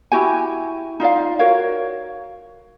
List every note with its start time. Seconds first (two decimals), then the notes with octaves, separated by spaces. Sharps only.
0.12 E4 F#4 G4 G#5
1.00 D#4 F4 D5 F5
1.39 F#4 A#4 C#5 F5